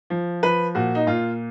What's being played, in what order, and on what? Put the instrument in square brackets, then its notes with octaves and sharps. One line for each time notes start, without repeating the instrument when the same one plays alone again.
[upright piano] F3
F3 B4
A#2 F#4
D#4
A#2 F4